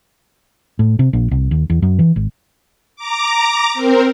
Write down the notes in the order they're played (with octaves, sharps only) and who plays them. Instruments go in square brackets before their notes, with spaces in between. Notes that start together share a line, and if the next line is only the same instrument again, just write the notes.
[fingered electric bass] A2
C3
A#1
C2
D#2
E2
F#2
E3
G#1
[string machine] A#5 D6
C4 A#4